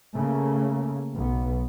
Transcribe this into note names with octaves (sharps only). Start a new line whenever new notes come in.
C#3 A3 A#3
B1 B3